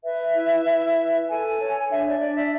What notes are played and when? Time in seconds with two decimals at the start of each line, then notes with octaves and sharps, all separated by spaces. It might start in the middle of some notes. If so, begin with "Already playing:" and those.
0.03 B4 E5
0.35 E4
0.65 E4
0.96 B4
1.27 A4 G#5
1.59 C#5
1.89 D4 E5
2.06 D5
2.20 D4 D5
2.37 E5